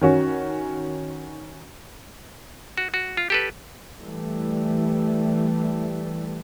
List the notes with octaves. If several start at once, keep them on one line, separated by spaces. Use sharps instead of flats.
D#3 C#4 F#4
F#4
F#4
F4
G4 A4 B4
E3 G3 A3